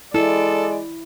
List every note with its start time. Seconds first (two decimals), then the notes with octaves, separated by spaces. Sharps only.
0.14 G#3 E4 A4 D5